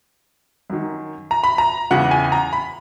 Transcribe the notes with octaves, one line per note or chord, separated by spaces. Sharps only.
F#2 D#3
A#5
B5
A#5
E2 C#3 E3 F#5
G#5
A#5
B5